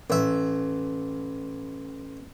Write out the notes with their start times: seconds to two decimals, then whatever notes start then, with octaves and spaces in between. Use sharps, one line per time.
0.10 A1 E5